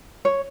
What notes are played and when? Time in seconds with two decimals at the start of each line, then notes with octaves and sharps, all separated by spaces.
0.25 C#5